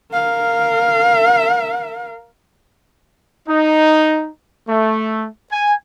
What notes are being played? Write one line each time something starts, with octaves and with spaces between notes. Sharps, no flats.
A#4 F5
D#4
A3
G#5